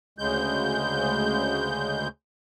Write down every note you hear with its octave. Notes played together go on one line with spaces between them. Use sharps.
D2 C#3 G#3 G6